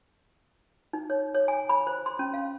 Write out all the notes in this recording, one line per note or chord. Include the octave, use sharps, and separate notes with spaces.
D#4
C#5
C#5
G#5
B5
C5
C6
C#4
F5